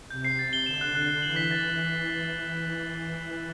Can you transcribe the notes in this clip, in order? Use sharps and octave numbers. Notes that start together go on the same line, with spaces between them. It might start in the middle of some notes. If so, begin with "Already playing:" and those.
C3 G6
C7
A6
G7
D3 E7
F#6
F#6
A6
E3 F#7
B6
A6